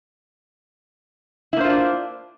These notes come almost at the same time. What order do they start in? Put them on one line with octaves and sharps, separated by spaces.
E4 A#3 C5 F4 D4